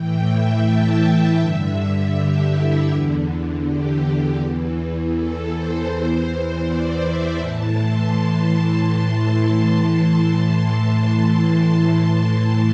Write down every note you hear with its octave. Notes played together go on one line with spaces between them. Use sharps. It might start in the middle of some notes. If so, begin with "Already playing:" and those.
Already playing: A2 E3 G5
E5
A5
G5
G2 D3 E5
G4
E4
E2 D3
G4
E2 E3
A4
C5
E2 E3 C5
D5
E5
A2 E3 A5
C6